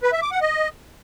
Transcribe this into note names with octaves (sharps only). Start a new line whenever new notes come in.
B4
E5
D6
F#5
D#5